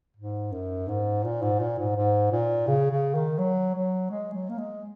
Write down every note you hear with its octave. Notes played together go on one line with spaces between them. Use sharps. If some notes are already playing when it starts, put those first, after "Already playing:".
G#2
F#2
G#2
A#2
G#2
A#2
G#2
G#2
A#2
C#3
C#3
D#3
F#3
F#3
G#3
F#3
A#3
G#3